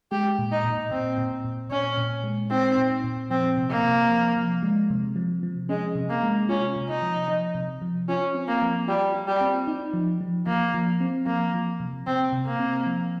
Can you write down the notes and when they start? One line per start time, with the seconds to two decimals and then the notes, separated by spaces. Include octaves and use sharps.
0.12 G#3 G4
0.39 A#2
0.52 D#4
0.64 A#2
0.91 A#2 C4
1.18 A#2
1.45 A#2
1.71 A#2 C#4
1.98 A#2
2.24 G#3
2.51 C4 D#4
2.78 A#2
3.04 A#2
3.30 F3 C4
3.58 C3
3.70 A#3
3.84 C3
4.09 F3
4.36 F3
4.63 G#3
4.90 C3
5.16 F3
5.43 F3
5.69 G#3 C#4
5.95 C3
6.10 A#3
6.23 G#3
6.49 C#4 F4
6.76 C3
6.89 D#4
7.02 F3
7.28 F3
7.55 C3
7.82 F3
8.08 C#4 F4
8.35 C4
8.48 A#3
8.62 F3
8.88 G3 F4
9.15 F4
9.27 G3
9.41 C4
9.67 D#4
9.94 F3
10.21 F3
10.47 F3 A#3
10.74 F3
11.00 C4
11.26 F3 A#3
11.54 F3
11.80 C3
12.06 C3 C4
12.33 C3
12.46 A#3
12.59 C4
12.86 F3